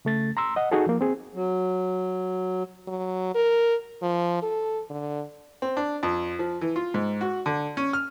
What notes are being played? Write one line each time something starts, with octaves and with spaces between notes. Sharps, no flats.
C#3 A3 A6
A#5 C6 E6
D#5 F#5
D#4 F#4 G#4 A4
F3 A#3
C4 G#4
F#3
F#3
A#4
F3
A4
D3
C4
D4
F2
F3
E3
F4
G#2
F#4
D3
C#4
F6